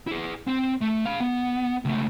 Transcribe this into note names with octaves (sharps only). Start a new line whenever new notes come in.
E4 G#4
C4
A3
F5 B5
B3
C#2 A3